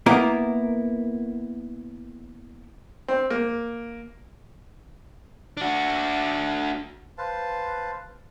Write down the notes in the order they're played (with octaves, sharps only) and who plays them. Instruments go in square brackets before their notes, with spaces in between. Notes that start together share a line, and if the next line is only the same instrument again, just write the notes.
[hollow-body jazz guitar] A#3 B3 E4 A#4
[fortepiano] C4
A#3
[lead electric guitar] D4 F#4
[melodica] B4 C5 F5 A5